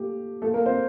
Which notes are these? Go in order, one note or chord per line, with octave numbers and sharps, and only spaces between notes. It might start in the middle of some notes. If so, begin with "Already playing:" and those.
Already playing: A#2 A3 G4
A#2 F3 A3 A#3 A4
A#3 A#4
C4 C5